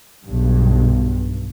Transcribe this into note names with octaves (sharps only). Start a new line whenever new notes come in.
B1 G2